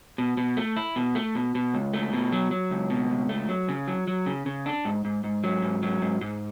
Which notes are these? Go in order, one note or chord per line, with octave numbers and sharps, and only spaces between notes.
B2
B2
A3
E4
B2
A3
B2
B2
C#2
A3
B2
F#3
F#3
C#2
B2
C#2
A3
F#3
C#3
F#3
F#3
C#3
C#3
D4
G#2
G#2
G#2
F#3
G#2
F#3
G#2
G#2